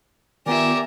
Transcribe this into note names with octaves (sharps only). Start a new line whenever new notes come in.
D#3 B3 F4 G4 A#4 D5 E5 G#5